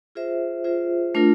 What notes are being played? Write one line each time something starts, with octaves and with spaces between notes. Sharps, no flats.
F4 G#4 C5 E5
F4 G#4 C5 E5
A3 D4 F4 A#4